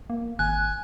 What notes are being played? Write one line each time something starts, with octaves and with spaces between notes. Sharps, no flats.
A#3
G#1 G#5 F#6